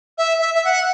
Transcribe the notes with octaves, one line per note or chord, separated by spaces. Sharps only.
E5
E5
E5
F#5